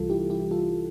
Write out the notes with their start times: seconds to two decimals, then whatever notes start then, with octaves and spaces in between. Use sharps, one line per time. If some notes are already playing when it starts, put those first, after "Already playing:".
Already playing: C2 C3 E3 G3 F4 A4
0.10 E4 G4
0.30 E4 G4
0.51 F4 A4